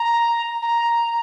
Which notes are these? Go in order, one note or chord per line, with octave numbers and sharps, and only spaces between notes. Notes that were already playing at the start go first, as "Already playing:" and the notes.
Already playing: A#5
A#5